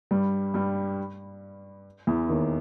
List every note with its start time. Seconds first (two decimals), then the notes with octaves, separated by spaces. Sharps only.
0.11 G2 G3
0.54 G2 G3
2.07 E2 E3
2.29 D#2 D#3